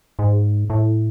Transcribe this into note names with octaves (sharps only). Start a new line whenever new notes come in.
G#2
A2